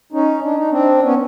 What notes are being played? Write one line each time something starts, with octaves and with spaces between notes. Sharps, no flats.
C#4 D#4
D4
D#4
C4 D4
B3 C#4